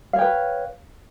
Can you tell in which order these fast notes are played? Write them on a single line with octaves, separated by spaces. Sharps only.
F5 C#5 G5 B4